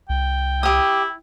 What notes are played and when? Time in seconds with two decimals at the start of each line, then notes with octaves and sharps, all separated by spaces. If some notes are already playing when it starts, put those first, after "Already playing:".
0.09 C2 G5
0.63 E4 G4 D#6